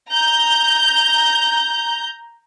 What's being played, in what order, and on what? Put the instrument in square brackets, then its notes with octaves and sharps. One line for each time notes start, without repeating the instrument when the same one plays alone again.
[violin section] A#5 G6